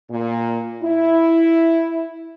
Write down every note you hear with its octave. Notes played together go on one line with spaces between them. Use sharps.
A#2
E4